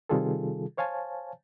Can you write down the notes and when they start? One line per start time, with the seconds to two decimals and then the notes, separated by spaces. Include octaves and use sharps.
0.09 C3 D#3 G3 F4 G#4 A4
0.77 C5 C#5 F5 G#5 A5